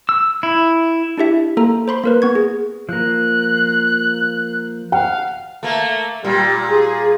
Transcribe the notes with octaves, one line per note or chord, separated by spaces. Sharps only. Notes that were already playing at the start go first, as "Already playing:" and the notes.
E6
E4
D4 E4 G4 E5
A#3 A4 A#5
C5 B5 C6
A#3 A#4 B4
B3 C#6 G#6
G#4
F3 A#3 F#6
F5 F#5
A3 A#3
A#2 G3
G#4